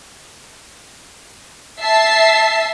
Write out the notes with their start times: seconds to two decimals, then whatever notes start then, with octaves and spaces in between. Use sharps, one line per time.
1.82 E5 A5 C7